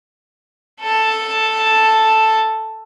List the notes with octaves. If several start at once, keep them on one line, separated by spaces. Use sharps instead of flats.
A4 A5